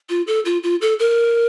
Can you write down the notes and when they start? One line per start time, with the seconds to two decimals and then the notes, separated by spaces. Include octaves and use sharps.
0.09 F4
0.27 A4
0.45 F4
0.63 F4
0.81 A4
0.99 A#4